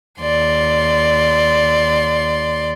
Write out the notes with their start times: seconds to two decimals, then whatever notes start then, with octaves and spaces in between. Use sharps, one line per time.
0.21 D#2 D5 C6